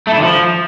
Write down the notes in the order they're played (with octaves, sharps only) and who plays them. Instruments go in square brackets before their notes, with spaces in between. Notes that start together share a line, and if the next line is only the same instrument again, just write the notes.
[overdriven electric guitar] A3
E4
D3
F3